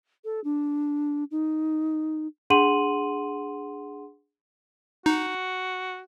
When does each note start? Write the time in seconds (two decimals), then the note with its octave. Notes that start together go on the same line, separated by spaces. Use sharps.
0.25 A4
0.44 D4
1.31 D#4
2.50 D4 G#4 F#5 C6 D#7 F#7
5.06 D#4 F#4